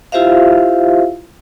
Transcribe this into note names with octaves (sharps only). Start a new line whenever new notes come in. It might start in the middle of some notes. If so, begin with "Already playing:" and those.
E4 F4 G4 C5 E5 F5